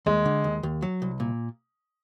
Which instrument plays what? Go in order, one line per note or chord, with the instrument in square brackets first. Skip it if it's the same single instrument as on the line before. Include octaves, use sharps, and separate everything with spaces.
[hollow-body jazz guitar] D#2 [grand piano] G#3
[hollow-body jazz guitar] D3
D#2
D#2
F#3
C2
A#2